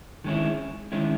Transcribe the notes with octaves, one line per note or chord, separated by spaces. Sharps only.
D#3 G#3 C#4 E4
D#3 G#3 C#4 E4